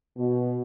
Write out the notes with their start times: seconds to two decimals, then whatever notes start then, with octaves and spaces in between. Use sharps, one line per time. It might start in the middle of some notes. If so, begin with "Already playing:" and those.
0.17 B2